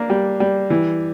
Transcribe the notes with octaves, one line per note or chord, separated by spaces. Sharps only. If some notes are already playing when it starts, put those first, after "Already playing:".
Already playing: A#3 D4
G3
G3
E3